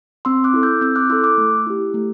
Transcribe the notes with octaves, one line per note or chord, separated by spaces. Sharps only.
C4 C6 E6
D6 F#6
E4 A4
E6 G6
C4 E6 G6
D6 F#6
E4 A4 C6 E6
D6 F#6
A3
E4 G4
A3